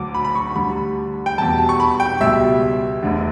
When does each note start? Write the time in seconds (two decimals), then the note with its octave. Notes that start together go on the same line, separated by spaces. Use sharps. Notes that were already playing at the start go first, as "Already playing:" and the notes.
Already playing: D2 D3 F#3 D6
0.14 B5
0.25 B5
0.35 C#6
0.55 D2 D3 G3 B5
1.26 G5
1.38 E2 B2 G3 A5
1.58 A5
1.69 C#6
1.80 B5
2.00 G5
2.20 C#2 B2 G3 E5
3.03 E1 D2 D3